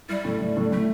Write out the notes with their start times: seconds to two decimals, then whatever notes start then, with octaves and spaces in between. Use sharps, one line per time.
0.09 G3 E4
0.25 A2
0.41 A2
0.57 A2
0.72 A2 A3